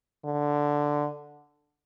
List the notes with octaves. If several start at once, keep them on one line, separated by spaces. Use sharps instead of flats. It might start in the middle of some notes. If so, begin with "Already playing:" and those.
D3